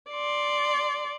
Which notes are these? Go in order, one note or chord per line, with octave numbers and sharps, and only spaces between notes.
D5 C6